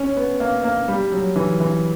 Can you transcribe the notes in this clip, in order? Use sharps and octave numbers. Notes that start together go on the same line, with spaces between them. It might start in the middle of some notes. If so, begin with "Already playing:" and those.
Already playing: C#4
B3
A#3
A#3
G3
F#3
E3
E3